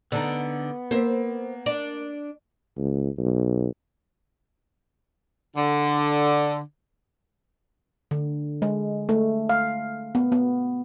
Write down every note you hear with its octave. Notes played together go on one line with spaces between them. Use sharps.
D3 B3 D4 D#4
A#3 C5 E5
D4
C#2
B1
D3
D3
G#3
A3
F5
B3
B3